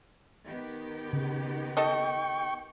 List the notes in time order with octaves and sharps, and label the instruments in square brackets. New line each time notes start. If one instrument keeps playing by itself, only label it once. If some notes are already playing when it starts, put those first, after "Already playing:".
[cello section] D#3 B3 G4
[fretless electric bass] C#3
[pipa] A4 D#5 [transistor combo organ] G5 C#6